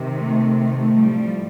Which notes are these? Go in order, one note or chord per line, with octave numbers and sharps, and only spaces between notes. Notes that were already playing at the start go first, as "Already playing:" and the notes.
Already playing: C3 D#3
A3
A3
A2 F3 G3